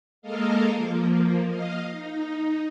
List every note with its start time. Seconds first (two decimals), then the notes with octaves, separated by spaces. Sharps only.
0.22 G#3 A#3 A4 A#4 D#5 F5
0.74 F3 A#3
1.48 D#5 F5
1.91 D#4